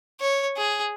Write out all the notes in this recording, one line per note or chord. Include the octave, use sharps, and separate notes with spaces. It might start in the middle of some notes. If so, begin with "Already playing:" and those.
C#5
G#4